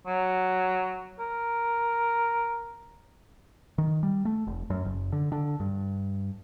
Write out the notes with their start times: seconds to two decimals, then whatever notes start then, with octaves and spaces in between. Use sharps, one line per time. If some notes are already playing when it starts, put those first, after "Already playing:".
0.07 F#3
1.19 A#4
3.78 D#3
4.03 G3
4.25 A3
4.47 F1
4.70 F#2
4.85 F#1
5.12 D3
5.32 D3
5.60 G2